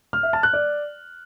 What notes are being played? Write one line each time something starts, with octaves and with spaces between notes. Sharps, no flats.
F6
E5
A5
F#6
D5